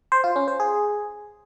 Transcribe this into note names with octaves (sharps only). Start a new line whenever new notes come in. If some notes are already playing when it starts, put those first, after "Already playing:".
C5
F4
C#4
C5
G#4